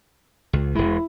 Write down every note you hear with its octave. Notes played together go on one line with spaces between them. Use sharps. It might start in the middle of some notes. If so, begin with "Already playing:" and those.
C#2
E1 G#3 E4